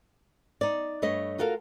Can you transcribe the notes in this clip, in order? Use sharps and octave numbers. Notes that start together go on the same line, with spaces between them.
D#4 D5
G2 A3 B4 C#5 D#5
F4 F#4 A4 A#4 F5